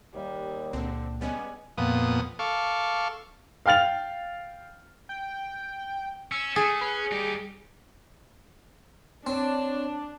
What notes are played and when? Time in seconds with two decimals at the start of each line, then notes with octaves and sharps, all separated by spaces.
0.14 D#2 G3
0.73 C#2 A#2 D3 C4
1.21 G3 G#3 B3 C#4 D5 G#5
1.78 F2 A#2 B3 D#6
2.39 A4 F5 C#6 D6
3.66 F5 G5 F6 A6 F7
5.09 G5
6.32 C#4 E6
6.56 A3 G#4
6.81 C#4 B4
7.12 G3 D#4 G4
9.27 C4 D4 C#5